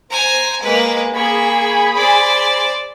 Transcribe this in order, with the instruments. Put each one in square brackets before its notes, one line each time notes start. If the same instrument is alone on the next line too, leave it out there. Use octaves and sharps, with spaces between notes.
[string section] C5 [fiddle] G#5 A#5
[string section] G#3 [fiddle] A#3 B4
[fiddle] A#3 C#6 [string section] G#4 B5
[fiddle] C5 D5